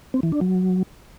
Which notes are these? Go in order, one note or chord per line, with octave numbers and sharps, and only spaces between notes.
C4
E3
D4
F#3